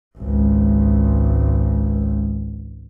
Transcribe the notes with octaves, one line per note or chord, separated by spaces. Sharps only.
G#1 C#2